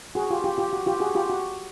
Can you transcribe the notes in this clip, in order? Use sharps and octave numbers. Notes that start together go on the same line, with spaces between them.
F#4 G#4
F4 G4
F4 G4
F4 G4
F#4
F4 G4
F#4 G#4
F4 G4
F#4